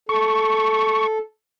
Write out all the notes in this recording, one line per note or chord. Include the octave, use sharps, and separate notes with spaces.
A4 C#6